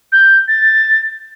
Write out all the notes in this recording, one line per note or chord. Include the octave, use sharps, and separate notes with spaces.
G6
A6